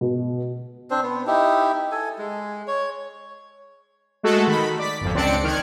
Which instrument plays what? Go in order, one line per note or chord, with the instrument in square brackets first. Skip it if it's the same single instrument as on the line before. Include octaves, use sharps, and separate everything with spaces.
[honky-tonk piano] B2
[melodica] C4 D4 C5
B3
D#4 E4 G4
A4 G#5
G#3
C#5
[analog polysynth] G#3 A3 F#4 A4
D#3 B5
D5 B6
G1 F2
C#2 C4 D4 D5 C#7 D7
D#3 F6 F#6 G#6